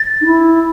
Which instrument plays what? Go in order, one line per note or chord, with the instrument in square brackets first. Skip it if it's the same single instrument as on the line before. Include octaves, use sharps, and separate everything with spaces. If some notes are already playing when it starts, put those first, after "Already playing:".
Already playing: [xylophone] A6
[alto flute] D#4
E4